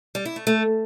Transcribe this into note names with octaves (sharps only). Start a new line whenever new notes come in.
G3
E4
A3
A3